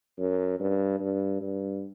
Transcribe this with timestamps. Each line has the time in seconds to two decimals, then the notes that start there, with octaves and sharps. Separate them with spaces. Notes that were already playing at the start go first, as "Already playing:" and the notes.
0.18 F#2
0.60 G2
1.00 G2
1.41 G2